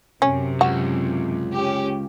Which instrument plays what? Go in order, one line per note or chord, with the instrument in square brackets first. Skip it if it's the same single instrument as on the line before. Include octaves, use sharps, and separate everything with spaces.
[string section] F#2 C3 [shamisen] C#4
[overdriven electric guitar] C#2 [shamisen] F#4
[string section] C#4 G4